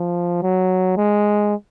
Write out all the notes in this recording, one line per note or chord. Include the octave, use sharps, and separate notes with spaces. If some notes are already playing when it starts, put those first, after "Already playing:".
Already playing: F3
F#3
G#3